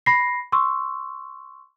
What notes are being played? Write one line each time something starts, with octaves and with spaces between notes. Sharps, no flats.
B5 A#6 C7
C6 C#6 E6